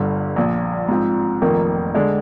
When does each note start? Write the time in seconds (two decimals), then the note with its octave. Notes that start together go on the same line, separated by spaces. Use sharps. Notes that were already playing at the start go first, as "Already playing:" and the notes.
Already playing: G1 G2 D3
0.36 A#1 A#2 F3
0.88 G#2 F3 C4
1.42 F1 F2 D#3 A#3
1.94 D3 G#3 D4